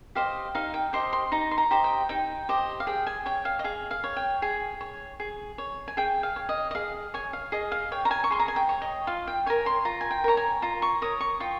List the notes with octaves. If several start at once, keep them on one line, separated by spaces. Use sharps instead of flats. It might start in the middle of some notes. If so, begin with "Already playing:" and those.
G4 C5 D#5 F5
D#4 F5
G5
G4 C5 D#5 C6
C6
D#4 A#5
C6
A#5
G4 C5 D#5
G5
D#4 G5
G4 C5 D#5
F5
G#4 G5
G#5
C#5 G5
F5
D#5
G#4 F5
F5
C#5
G5
G#4 G#5
C#5
G#4
C#5
G#5
G#4 G5
F5
C#5
D#5
D#5
G#4 F5
C#5 G#5
F5
G#4 D#5
F5
C#5 G5
A#5
G#5
C#6
G#4 C6
A#5
G#5
G5
C#5
D#5
F4 F5
G5
A#4 C#5 G#5
C6
F4 A#5
G#5
G5
A#4 C#5 A#5
G#5
F4 A#5
C#6
A#4 C#5 D#6
C#6
F4 G5